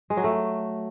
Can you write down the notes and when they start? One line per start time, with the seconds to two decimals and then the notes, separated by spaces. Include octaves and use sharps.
0.10 G#3
0.17 F#3
0.24 A3